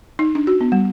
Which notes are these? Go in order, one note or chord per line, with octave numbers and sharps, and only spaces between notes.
D#4
D4
F#4
B3
G3